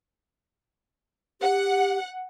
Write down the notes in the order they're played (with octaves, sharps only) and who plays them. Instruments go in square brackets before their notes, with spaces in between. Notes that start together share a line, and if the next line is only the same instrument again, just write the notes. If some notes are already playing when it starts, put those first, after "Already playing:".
[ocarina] G4 [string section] F#5